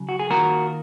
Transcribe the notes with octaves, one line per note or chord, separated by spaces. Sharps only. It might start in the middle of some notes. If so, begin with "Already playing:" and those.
Already playing: C#3 F#3
F#4
G#4
D#3 A#3 F4 F#4 A#4